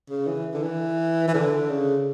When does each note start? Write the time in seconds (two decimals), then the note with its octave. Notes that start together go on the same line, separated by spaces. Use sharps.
0.10 C#3
0.27 E3
0.54 D3
0.63 E3
1.28 E3
1.34 D3
1.70 C#3